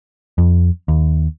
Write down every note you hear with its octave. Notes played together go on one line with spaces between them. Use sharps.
F2
D#2